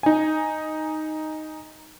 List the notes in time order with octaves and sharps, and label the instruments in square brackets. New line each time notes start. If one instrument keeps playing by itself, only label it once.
[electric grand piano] D#4 G#5